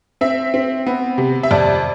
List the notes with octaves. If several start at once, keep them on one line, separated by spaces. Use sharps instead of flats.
C4 E5
C4
B3
C3
E5
F2 D5